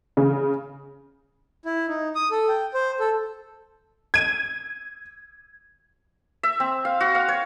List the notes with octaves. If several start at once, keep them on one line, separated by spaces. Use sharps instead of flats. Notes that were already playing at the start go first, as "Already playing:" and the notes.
C#3
E4
D#4
D#6
A4
G5
C5
A4
G#6 D#7
E5
C4
F5
F#4
F5
C#5